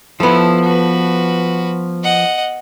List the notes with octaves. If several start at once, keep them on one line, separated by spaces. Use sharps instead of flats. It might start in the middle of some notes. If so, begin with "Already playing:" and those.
F3 B3 E4 A4
F#4 B4
D#5 F#5